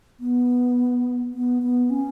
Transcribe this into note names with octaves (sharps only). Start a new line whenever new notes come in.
B3
B3
B3
C#4